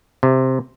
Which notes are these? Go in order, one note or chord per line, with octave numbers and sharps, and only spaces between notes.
C3